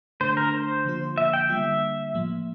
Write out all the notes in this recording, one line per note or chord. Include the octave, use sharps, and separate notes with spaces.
D3 A3 D4 C5
A#4
C5
D3 F3 A#3 F4
E5
G5
D3 G3 A#3 F4 E5
A2 F3 A#3